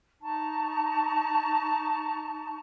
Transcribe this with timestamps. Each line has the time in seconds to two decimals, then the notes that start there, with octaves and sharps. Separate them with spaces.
0.22 D#4 A5 A#5 C#6